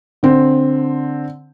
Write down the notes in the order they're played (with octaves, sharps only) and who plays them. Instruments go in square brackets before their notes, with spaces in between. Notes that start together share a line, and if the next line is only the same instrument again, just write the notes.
[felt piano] D3 C4